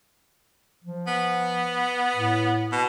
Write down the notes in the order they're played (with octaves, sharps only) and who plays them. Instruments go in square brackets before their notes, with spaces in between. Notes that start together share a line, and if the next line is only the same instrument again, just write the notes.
[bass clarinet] F3
[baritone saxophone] B3
[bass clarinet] A2
[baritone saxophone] B2